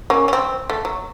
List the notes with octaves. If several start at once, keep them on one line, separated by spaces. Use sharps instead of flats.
A#3 C#4
C#4
C4
A3
F#3